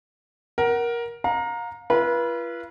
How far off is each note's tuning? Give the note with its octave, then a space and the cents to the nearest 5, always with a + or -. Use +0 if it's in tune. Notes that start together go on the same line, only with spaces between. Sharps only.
A#4 +15 F#5 +15
F5 +35 A#5 +0
F4 -40 B4 -30